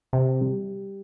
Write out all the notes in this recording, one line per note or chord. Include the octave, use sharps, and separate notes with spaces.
C3
G3